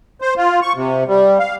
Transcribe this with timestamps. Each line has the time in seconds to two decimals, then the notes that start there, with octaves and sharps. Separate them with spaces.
0.21 C5
0.37 F4
0.62 C#6
0.75 C3
1.08 G3
1.39 F5